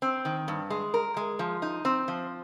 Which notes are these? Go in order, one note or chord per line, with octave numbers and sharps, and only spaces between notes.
C4
D#3
G2
G#3
A#4
G#3
F3
D#4
C4
F3